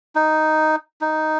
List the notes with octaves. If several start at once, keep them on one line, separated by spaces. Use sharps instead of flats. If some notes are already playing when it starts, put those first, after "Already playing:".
D#4
D#4